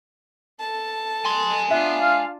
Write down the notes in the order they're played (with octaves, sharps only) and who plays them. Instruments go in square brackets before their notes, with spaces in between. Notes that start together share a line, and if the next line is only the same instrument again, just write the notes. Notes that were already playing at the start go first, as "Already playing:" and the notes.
[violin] A4 A5
[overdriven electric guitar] G#5 C6
[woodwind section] B3 [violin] D4 F4 [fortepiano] E5
[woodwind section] F5